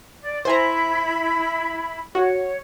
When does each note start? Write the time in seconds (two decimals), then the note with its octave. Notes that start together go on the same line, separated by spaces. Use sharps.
0.21 D5
0.45 E4 C5 G#5 A#5 B5
2.15 F#4 C#5